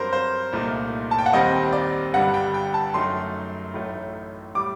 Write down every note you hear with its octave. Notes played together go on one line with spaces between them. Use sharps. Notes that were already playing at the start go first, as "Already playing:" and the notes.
Already playing: G2 F#3 C4 A#4 C5
C5
C2 A#2 A3 D#4
A5
G5
F#5
D#2 D#3 G3 C4 D#5
D5
G1 G2 D3 G3 F#5
G5
G5
A5
F#2 F#3 A3 D#4 C6
A1 A2 F#3 A3 D#4
A2 G3 D6